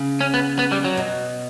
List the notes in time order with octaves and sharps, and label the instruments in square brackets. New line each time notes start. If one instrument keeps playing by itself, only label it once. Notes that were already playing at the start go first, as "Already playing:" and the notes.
Already playing: [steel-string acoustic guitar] C#3
[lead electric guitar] C#4
B3
B3
G3
F#3
[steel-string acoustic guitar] B2